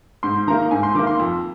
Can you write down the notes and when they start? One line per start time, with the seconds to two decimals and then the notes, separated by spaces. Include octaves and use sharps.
0.23 G#2 C6
0.47 D#3 A#3 A#5
0.71 G#2 G#5
0.83 C6
0.95 D#3 D6
0.99 A#3
1.07 C6
1.19 F2